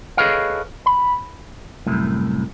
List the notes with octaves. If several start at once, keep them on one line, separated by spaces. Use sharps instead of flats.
G#4 A4 B4 C#5 D#5 F5
B5
C2 F#2 A2